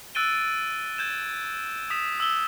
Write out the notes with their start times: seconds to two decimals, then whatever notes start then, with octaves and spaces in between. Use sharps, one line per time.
0.15 E6 F#6 A6 D7 D#7 G7
0.98 G6 G#6 E7
1.90 D#6 B6 E7
2.20 E6 G7